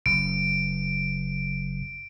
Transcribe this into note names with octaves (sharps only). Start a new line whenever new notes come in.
F#1 D7